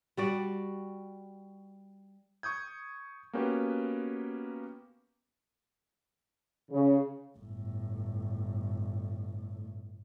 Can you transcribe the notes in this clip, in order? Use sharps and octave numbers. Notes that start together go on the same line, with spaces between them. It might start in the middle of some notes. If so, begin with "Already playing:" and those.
G3 F#4 D5
C#6 D#6 G6 G#6
A#3 B3 C#4 F#4 G4 B4
C#3
G1 A2